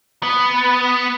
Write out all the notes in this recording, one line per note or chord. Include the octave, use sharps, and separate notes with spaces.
B3